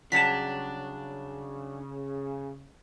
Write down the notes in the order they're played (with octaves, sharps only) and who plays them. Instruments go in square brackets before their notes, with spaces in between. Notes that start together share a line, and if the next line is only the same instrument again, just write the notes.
[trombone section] C#3 [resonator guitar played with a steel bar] F#3 G3 A5 [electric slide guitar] D4 [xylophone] B6 E7